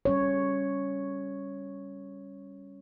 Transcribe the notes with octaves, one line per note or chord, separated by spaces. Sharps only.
G3 C#4 C#5